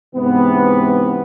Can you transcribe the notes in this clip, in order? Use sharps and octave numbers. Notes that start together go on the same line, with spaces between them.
G#2 C3 E3 B3